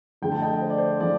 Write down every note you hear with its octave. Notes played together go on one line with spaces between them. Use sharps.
D2 D3 F3 A3 G5
A5
D#5 G5
C5
D5
C5
D3 F3 A3 D5